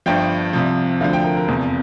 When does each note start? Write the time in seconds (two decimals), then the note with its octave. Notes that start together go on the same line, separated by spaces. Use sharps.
0.06 G1 G2 F3 G5
0.53 C2 C3 F3
1.01 D2 D3 F3 F5
1.13 G5
1.24 A#4
1.37 A#4
1.48 F1 E2 C3 F3